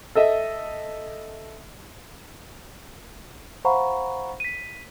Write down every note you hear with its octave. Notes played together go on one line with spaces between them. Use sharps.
A4 D#5 E5
C5 F5 F#5 A#5 B5 C#6
B6 D#7